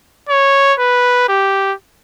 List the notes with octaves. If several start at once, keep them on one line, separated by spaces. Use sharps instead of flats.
C#5
B4
G4